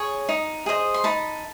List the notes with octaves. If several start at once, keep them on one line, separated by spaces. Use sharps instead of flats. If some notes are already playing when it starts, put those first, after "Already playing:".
Already playing: G#4 C#5
D#4
G#4 C5 D#5
C6
D#4 A5 B5